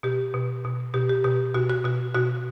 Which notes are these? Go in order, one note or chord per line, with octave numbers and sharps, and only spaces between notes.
B2 G4
B2
B2
B2 G4
G4
B2 G4
B2 F#4
F#4
B2 F#4
B2 F#4